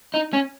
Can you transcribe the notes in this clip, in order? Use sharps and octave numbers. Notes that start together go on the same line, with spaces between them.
D#4
C#4